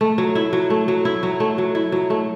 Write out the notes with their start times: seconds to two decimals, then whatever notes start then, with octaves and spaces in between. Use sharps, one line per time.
0.01 A3
0.18 F#3
0.35 E4
0.53 F#3
0.70 A3
0.88 F#3
1.05 E4
1.23 F#3
1.40 A3
1.58 F#3
1.75 E4
1.92 F#3
2.10 A3